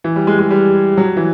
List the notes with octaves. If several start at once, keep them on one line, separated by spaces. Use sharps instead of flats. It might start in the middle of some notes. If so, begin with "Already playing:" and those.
E3
G3
G#3
G#3
G3
F#3
E3